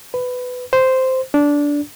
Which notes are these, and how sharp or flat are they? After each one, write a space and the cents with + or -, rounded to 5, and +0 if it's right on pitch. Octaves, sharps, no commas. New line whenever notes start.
B4 +15
C5 -5
D4 -15